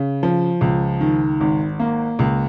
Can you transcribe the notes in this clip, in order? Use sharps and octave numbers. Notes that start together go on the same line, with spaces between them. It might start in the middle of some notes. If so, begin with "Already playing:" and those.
Already playing: C#3
F3
C#2
D#3
G#1
A#3
C#2